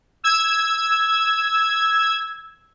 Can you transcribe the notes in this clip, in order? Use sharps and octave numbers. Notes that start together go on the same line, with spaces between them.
E6 G#6